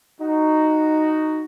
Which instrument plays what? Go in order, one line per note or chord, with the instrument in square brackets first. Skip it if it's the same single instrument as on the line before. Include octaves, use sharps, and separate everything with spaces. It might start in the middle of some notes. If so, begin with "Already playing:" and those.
[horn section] D#4 F#4